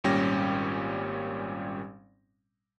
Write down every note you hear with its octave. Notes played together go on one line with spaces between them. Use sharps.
G#1 A#2 G3 C#4 G4 A#6